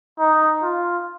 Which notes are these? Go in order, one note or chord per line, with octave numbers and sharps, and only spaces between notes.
D#4
F4